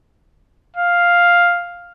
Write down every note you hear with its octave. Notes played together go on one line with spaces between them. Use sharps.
F5